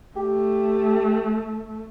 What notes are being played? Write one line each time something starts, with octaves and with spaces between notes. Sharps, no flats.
A3 G4